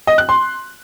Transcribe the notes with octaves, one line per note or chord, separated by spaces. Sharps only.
D#5
F#6
C6